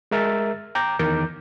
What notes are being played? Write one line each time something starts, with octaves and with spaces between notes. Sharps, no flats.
G#3 A#4 E5 F6 A6
G5 A#5 D6 G6
E2 D#3 A#4 D6 G6